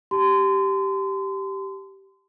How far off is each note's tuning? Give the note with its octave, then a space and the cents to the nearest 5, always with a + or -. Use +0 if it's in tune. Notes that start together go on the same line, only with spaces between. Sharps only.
G4 -10 A5 +0 C6 -30